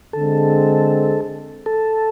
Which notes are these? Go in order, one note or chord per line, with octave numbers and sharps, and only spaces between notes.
D3 G#3 C4 A4
A4